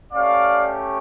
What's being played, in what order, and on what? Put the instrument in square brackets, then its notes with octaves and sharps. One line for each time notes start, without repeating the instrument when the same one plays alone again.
[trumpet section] A3 C#4 G4 D5 F5